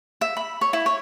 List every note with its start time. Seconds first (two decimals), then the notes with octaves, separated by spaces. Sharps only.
0.21 E5
0.37 B5
0.61 C#5
0.73 E4
0.86 C#5